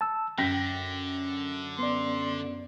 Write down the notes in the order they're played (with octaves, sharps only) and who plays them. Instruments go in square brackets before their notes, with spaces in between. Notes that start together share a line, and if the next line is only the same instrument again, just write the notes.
[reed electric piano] A5 E6
[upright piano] F#2 A#6 B6 [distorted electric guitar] D3 [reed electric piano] G5
[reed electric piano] B3 D5 [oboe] C6